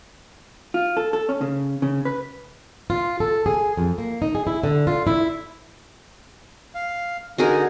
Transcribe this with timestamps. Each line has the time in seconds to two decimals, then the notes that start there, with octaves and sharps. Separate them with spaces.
0.74 F4
0.97 A4
1.13 A4
1.29 C#4
1.41 C#3
1.82 C#3
2.05 B4
2.90 F4
3.20 A4
3.46 G#4
3.77 F2
3.98 A#3
4.22 D#4
4.35 G#4
4.47 E4
4.64 D3
4.87 F4
5.07 E4
6.75 F5
7.38 D3 D#4 F#4 G#4 A#4